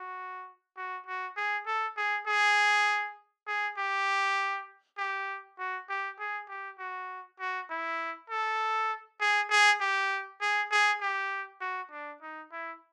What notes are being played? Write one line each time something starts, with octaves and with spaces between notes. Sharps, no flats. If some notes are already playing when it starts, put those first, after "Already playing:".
Already playing: F#4
F#4
F#4
G#4
A4
G#4
G#4
G#4
G4
G4
F#4
G4
G#4
G4
F#4
F#4
E4
A4
G#4
G#4
G4
G#4
G#4
G4
F#4
D4
D#4
E4